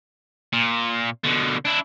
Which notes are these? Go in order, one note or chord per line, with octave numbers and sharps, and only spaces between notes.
A#2
B2 D3
D4 E4